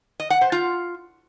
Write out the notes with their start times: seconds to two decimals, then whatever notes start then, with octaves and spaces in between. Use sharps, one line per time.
0.20 D#5
0.30 F#5
0.41 C5
0.52 F4